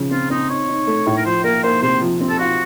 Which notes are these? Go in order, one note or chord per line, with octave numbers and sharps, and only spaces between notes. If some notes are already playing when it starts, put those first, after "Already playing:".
Already playing: C#3 F3
C4 F4
C4 D#4
D#4 C#5
D#4
A3
A2
A#4
F3 C5
A#3 A#4
A#3 C5
C3 C5
F3
C4
A4
F4 F#4